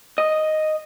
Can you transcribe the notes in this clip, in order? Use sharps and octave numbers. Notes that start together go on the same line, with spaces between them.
D#5